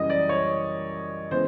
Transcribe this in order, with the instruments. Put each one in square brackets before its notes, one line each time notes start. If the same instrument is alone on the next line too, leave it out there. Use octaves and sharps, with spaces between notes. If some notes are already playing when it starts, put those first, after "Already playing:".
Already playing: [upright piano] F#2 C#3 E3 G3 [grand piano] D#5
[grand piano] D5
C#5
[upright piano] C#3 E3 G#3 B3 [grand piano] C5